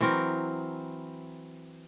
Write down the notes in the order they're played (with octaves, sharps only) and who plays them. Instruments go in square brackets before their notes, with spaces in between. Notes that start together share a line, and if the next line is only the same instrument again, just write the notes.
[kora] E3 F#3 C4 A#4